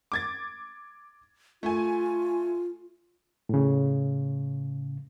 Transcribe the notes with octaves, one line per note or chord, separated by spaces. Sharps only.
D6 G#6 A6
A3 F4 G#5
A2 C#3